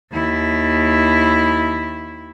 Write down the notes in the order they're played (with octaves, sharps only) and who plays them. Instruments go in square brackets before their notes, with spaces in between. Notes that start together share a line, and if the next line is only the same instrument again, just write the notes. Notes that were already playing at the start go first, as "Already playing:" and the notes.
[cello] D#2 E4